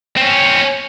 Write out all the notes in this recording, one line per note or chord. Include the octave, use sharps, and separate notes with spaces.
C4 C#4